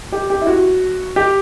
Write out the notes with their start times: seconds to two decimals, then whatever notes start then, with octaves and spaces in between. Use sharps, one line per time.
0.12 G4
0.30 G4
0.41 E4
0.47 F#4
1.16 G4